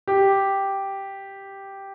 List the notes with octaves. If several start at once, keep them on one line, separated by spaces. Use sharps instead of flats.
G4